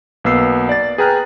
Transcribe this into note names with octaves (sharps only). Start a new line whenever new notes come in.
B1 A#3 B3 E6 C7
D5 A6
G#4 B4 G5 A#5 F6 F#6